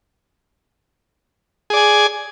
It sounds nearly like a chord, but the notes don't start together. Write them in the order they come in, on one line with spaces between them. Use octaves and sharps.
G#4 D5 G#5